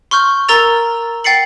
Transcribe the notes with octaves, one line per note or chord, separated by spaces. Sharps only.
C6 C#6 F6 G6
A#4 A#5 E6 A6 F7
F#5 G5 A6 C7 C#7 F#7